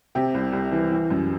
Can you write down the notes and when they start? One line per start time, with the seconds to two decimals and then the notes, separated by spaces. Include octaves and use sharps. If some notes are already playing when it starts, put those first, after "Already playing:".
0.15 C3 G4
0.34 C2
0.53 C2
0.72 E3
0.92 E3
1.10 F#2